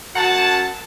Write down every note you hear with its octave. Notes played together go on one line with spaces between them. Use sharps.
F#2 F#5 A5